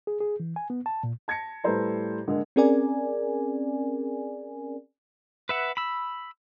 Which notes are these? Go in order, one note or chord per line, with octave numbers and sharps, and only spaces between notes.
G#4
G#4
E3
G#5
B3
A5
A#2
A5 G#6 A#6 C#7
A2 G3 A4 B4 C5 A#5
D3 G#3 A#3
C4 C#4 G#4 A#4 D5 G#5
B4 E5 F#5
B5 E6